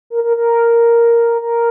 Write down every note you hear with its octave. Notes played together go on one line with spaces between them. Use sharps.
A#4
A#4
A#4
A#4